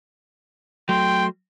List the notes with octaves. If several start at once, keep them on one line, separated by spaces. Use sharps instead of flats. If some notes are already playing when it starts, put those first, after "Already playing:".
F#3 A3 G5 C6